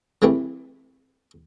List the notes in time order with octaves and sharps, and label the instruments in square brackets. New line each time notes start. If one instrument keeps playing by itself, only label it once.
[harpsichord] C#3 E3 G3 A3 C4